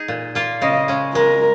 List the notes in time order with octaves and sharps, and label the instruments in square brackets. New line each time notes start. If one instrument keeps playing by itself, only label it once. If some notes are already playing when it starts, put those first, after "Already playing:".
Already playing: [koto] D#4 G#4
A#2
A#3 F4
[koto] C#3 [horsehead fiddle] D#5
[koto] G#3 C#4
[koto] G#3 [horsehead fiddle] A#4